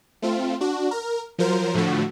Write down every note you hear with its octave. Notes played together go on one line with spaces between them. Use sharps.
A3 C4 F4
D4 F#4
A#4
F3 F#3 A#4 C5
A2 D3 F3 A3 F#4